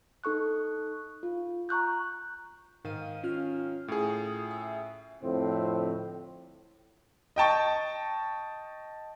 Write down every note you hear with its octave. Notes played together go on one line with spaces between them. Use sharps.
D#4 A4 C#6 F#6
F4
A#5 C#6 F#6 G6
G#2 D#3 F5 D#7
C#4 F4 F6
A2 G#4
E5
F2 A2 D3 C4
D#5 G5 A5 C#6